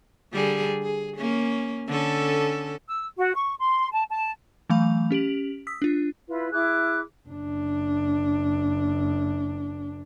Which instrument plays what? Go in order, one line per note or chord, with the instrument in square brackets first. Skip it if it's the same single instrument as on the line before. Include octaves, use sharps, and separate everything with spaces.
[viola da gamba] D3 G3 G#4
G#4
A#3 C#4
D3 C#4 A4
[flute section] E6
F#4
C#6
C6
A5
A5
[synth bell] E3 F#3 A3 F5 B5 F7
C#4 G4 D7 F#7
D#6 E6 B6
D4 F4
[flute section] E4 F4 B4
E4 G#4 D6 F#6
[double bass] F#1 D4